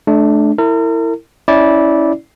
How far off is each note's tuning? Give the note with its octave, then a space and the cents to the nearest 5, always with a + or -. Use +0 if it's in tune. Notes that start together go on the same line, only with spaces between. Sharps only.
A3 -30 D4 +5
E4 +0 A#4 -40
C#4 +0 E4 -20 D5 -10